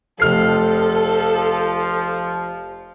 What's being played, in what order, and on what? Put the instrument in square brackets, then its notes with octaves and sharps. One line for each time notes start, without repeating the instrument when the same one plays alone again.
[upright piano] F1 F6 C7 [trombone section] F3 [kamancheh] A4